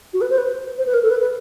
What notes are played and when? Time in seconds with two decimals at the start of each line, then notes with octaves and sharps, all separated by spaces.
0.13 F#4
0.21 B4
0.30 C5
0.38 B4
0.78 C5
0.86 B4
0.93 A#4
1.02 A4
1.10 B4
1.20 B4